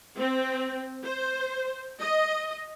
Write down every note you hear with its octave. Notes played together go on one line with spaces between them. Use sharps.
C4
C5
D#5